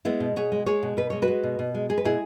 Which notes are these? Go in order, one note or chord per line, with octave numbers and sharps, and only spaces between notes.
G#3 B3 E4
B2
B2 G#4 C#5
G#3
G#3 G#4 C#5
B2
B2 B4
G#3 C#5
F#4 B4
G#3
B2
B2
G#3
G#3 G#4
B4
B2 E4 G#4